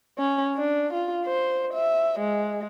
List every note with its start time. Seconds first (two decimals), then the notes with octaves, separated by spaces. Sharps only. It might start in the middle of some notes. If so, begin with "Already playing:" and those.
0.18 C#4
0.55 D4
0.93 F4
1.25 C5
1.73 E5
2.19 G#3